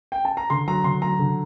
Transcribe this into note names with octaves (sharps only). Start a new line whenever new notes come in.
G5
A5
A#5
D3 C6
F#3 A#5
D3 C6
F#3 A#5
D3